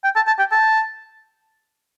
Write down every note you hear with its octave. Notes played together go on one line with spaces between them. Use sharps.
G5
A5
A5
G5
A5